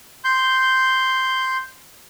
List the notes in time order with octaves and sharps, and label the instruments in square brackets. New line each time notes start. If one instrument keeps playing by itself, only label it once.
[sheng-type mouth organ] C6 G6